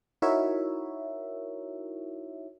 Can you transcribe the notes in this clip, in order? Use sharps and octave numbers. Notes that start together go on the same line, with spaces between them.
D#4 E4 F#4 A#4 C#5 E5